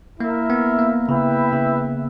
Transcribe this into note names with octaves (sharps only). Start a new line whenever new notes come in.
A#3 E4 A#4 E5
B3
A#3
C#3 E4 B4 E5 G5
C#3